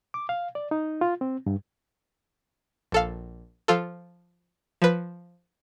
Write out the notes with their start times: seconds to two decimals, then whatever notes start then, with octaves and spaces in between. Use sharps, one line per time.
0.14 D6
0.29 F5
0.55 D5
0.71 D#4
1.01 F4
1.21 C4
1.46 G2
2.92 A#1 A4 F5
3.68 F3 F4 A4
4.82 F3 B4